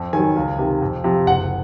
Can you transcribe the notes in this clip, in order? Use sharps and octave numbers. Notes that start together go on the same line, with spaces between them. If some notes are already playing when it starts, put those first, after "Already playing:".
Already playing: F2
D#3 F#3 G#5
C#2
C3 D#3
F2
C3 F3
F#1 F#5